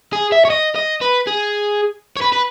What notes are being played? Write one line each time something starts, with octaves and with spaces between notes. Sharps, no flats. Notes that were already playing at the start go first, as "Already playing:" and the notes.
G#4
E5
C#5
D#5
D#5
B4
G#4
C#5
B4
B4